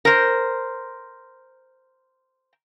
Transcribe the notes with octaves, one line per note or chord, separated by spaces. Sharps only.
A#4 C5